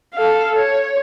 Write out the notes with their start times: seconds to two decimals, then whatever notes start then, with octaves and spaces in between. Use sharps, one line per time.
0.14 A4 F5
0.56 C#5